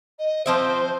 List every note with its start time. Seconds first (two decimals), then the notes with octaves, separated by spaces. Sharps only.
0.19 D#5
0.46 F3 C4 C5 E5